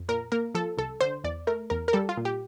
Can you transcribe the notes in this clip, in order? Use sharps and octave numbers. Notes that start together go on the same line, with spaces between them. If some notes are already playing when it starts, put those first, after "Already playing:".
Already playing: F2
A#2 A#4
A#3 A#4
F3 A4
C2 A4
D3 C5
E2 D5
A3 A#4
E2 A#4
A#4
G3 A4
F4
A#2
G4